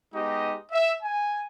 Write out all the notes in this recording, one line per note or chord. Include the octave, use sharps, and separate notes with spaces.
G#3 B3 D#4 G4 D#5
E5
G#5